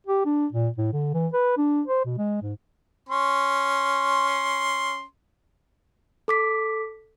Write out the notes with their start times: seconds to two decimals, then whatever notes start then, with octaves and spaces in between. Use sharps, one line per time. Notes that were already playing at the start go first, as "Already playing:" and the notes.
0.07 G4
0.25 D4
0.52 A#2
0.77 A2
0.93 D3
1.13 E3
1.33 B4
1.57 D4
1.87 C5
2.05 B2
2.18 G#3
2.42 G#2
3.09 C#4 C6
6.28 A4 D6 B6